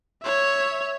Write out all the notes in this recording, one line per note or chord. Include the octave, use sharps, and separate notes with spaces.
C#5 E5